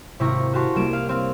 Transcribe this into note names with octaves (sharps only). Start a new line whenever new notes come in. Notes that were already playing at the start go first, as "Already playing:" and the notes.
G#1 C3 E4 F4 A#5 C#6
F#4 G4 F5 A5 C6 C#6
C2 G3 A#3 G4 D7 E7
F5
C4 F5